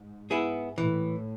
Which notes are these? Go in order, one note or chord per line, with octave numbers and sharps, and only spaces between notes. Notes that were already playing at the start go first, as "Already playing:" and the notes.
Already playing: G#2
B3 E4 G#4
A2 E3